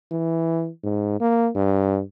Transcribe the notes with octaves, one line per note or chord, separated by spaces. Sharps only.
E3
G#2
A#3
G2